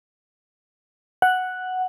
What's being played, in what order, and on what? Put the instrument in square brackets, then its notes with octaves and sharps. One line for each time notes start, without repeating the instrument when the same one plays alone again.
[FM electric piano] F#5